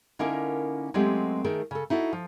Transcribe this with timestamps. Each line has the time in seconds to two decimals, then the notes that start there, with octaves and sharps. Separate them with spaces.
0.19 D3 A#3 C#4 D#4 E4 A#4
0.94 F#3 G#3 A3 B3 C4 G4
1.44 D#3 A3 G#4 A#4
1.71 C#3 A4
1.90 D#4 E4 F#4 A4
2.13 F3